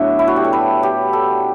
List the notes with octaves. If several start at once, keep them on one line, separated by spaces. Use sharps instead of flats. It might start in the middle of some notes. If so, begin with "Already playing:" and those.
Already playing: A2 F#3 B3 D4 E5
E4
F#4
G4
A4
B4
G4
A4